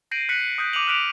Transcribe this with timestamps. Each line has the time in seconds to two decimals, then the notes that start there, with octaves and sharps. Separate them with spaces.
0.11 G6 A#6 C7 D7 D#7 F#7
0.29 F#6 B6 C#7 D#7 F#7
0.58 D#6 F#6 G6 B6 C#7
0.73 D6 D#6 C#7 D#7 F7 F#7
0.87 F6 F#6 B6 D7 F7 F#7